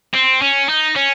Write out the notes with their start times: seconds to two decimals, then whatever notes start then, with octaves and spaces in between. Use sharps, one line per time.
0.14 C4
0.42 C#4
0.69 D#4
0.96 C#4